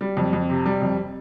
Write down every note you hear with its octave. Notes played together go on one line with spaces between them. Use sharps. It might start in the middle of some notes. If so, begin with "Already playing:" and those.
G3
F2
F2
C3
G3
F2